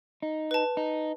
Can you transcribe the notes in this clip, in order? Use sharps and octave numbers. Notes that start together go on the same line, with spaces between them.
D#4
B4 A5
D#4